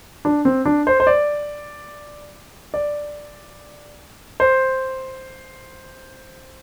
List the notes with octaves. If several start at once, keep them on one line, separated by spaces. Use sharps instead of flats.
D4
C4
D4
C5
C5
D5
D5
C5